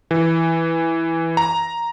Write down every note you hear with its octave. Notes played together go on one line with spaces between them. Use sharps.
E3
A#5